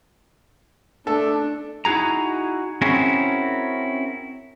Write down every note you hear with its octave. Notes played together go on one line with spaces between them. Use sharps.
A3 D4 A4
D#4 E4 F#4 G#4 A#5
C4 C#4 E4 F#4 G#4 A#4